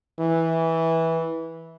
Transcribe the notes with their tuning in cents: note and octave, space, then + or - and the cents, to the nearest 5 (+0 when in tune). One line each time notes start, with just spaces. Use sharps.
E3 -10